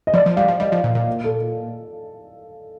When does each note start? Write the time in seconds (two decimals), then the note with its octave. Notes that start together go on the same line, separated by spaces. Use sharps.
0.07 D#5
0.14 F3 D5
0.26 F3
0.36 G3 F5
0.48 F3
0.60 G3 D#5
0.72 F3
0.84 A#2
0.95 A#2
1.24 A4